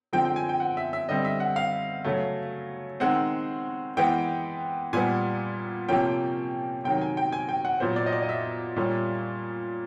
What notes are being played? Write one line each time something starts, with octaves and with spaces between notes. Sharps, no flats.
D3 F3 G#3 C4 G5
G5
G#5
G5
F#5
E5
E5
D3 G3 C4 D#5
E5
F#5
F5
C#3 F#3 A3
D#3 G#3 C4 F#5
E3 G#3 B3 G5
A#2 G3 B3 G#5
C3 F3 A#3 C#4 G5
C3 D#3 F#3 G5
G#5
G5
G#5
G5
F#5
A#2 F#3 B3 C5
D5
D#5
D5
D#5
E5
A#2 G3 A#3 C#4